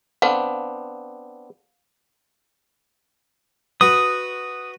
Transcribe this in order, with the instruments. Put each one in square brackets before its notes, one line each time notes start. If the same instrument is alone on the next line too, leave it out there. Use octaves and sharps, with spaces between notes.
[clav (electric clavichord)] B3 C4 D4 [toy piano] F5
[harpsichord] F#4 B4 [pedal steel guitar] D#6